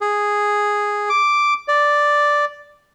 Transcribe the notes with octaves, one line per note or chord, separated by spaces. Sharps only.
G#4
D6
D5